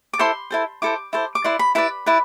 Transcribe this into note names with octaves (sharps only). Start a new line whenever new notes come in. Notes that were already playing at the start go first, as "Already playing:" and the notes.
D6
E4 A4 C5 C6
E4 A4 C5
E4 A4 C5 D6
E4 A4 C5
D6
E4 B4 D5 C6
B5
E4 B4 D5 B5
E4 B4 D5